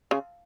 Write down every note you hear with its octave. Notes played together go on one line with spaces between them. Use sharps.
C#3